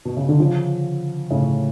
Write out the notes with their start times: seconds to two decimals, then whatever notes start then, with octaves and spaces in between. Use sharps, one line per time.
0.05 B2
0.17 C#3
0.29 D3
0.40 C#3 F3
1.30 A2 C#3